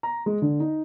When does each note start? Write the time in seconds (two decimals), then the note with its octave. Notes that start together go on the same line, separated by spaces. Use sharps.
0.03 A#5
0.26 G#3
0.42 D3
0.60 D#4